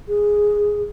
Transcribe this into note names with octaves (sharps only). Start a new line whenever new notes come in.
G#4